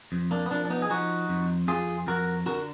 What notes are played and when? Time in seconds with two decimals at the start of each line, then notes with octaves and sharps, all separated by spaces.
0.12 F2
0.31 A#3 D4
0.46 B3
0.51 F3 A#3 D4
0.65 D4
0.70 B3 D#4
0.82 G#4
0.90 F3 D#4 F#4
1.29 F2
1.68 F2 F4 G#4
2.07 F2 F#4 A#4
2.46 D3 F#4 A#4